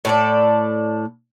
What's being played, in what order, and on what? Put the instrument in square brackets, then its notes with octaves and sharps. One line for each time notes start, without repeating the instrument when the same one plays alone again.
[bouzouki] A2 A4 D5